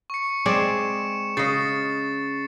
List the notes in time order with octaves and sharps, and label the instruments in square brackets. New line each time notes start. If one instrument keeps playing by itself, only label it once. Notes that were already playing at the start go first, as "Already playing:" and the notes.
[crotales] C#6 C#7
[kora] G#3 C4 D5 [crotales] D7 E7
[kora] C#3 D#5 [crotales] A6 C7 C#7